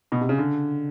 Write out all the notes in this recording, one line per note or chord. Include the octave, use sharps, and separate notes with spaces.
B2
C3
C#3
D3